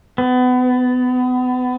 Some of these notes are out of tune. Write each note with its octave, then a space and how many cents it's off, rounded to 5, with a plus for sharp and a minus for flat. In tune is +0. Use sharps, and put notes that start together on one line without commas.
B3 +30